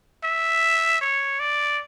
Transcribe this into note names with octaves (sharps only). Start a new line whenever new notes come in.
E5
C#5
D5